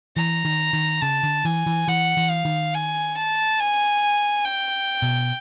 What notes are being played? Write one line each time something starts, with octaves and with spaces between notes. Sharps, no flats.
E3 A#5
D#3
D#3
C#3 A5
D3
E3 G#5
E3
E3 F#5
E3
F5
D#3
G#5
A5
G#5
G5
B2